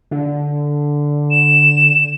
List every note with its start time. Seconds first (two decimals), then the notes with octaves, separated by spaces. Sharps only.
0.11 D3
1.31 E7